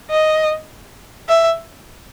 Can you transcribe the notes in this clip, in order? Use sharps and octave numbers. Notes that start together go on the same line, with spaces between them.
D#5
E5